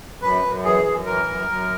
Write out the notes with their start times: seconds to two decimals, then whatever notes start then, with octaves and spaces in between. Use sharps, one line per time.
0.22 F#2 B4
0.43 F#2
0.64 E3 G#4
0.85 F#2
1.06 E3 A#4
1.27 F#2
1.48 F#2